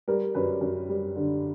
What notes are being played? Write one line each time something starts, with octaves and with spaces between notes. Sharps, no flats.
G3 A#4
F#2 B4
F#2
G3
D3